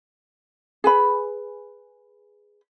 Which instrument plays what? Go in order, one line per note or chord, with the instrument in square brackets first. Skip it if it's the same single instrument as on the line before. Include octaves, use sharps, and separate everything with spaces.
[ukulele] G#4 B4 B5